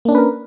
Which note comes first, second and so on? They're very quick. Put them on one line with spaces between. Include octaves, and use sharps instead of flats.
A#3 D4 C#4 B4 A#4